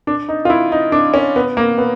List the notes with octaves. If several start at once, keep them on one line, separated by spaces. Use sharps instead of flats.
D4
D#4
F4
E4
D#4
D4
C#4
B3
A#3
B3